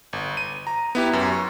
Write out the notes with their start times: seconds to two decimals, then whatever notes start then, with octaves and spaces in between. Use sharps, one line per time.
0.13 G1
0.37 D#7
0.67 A#5
0.95 B3 E4 G4
1.13 F#2
1.32 C#6